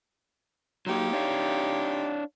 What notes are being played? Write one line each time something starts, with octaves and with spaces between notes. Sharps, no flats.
F#3 A#3 D#4 F4 G4
D4 C#5 F5